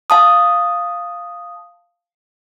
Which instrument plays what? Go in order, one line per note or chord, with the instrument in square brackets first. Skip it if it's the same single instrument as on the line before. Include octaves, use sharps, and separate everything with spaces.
[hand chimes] F5 A5 D#6